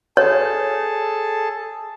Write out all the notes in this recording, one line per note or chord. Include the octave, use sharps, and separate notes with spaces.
G#4 A4 C#5 A5